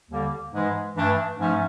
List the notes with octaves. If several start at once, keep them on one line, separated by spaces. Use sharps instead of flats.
D#2 D3 G3 A#3
G#2 E3 G#3
G2 E3 A3 D4
G#2 F3 A3 C#4